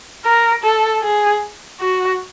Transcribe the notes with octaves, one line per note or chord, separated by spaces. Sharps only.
A#4
A4
G#4
F#4